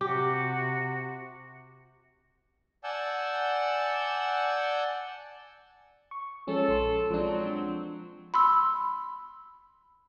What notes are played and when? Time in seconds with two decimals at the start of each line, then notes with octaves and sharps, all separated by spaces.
0.01 C3 F#4 G4 D6
2.84 D5 F#5 G#5 A5 E6 G6
6.11 C#6
6.47 F3 G#3 C#4 A4
6.68 A#1 C6
7.10 F3 F#3 G#3 C4 D4
8.34 B5 C6 E6